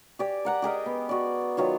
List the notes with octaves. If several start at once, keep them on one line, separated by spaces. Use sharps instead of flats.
G4 D5 G#5
A#4 F#5 A#5
G4 G#4 A#4 D#5
B3
F#4 D5
D#3 F#3 F4 C#5